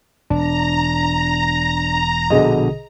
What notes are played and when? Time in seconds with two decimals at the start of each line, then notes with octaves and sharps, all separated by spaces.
0.30 E1 D4 A#5
2.30 A#1 B2 D3 G#4 D#5